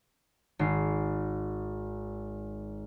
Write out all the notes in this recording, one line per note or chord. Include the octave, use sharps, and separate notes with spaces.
G#1 C7